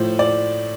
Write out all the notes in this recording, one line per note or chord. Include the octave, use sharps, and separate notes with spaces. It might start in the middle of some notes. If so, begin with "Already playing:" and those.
Already playing: A2 F3 C5
D5